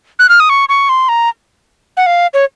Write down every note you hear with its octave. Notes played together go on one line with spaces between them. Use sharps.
F#6
F6
D#6
C#6
C#6
C6
A#5
F#5
F5
C#5